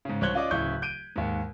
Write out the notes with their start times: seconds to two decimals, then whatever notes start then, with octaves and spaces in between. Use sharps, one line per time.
0.05 G#2 C#3
0.21 C2 C5 C#5 F#6 G#6 G7
0.34 C#4 F4 D5 D#5 D6
0.51 D1 C#3 E4 C#6 G6
0.82 G6 D7 D#7
1.16 D#2 G#2